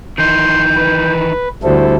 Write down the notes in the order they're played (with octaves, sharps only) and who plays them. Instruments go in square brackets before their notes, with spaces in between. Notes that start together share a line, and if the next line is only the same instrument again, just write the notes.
[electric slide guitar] D#3 E3 D#4 [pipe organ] C6 [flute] G6
[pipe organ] B4
[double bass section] D2 [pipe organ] G3 E4 A4 [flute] C5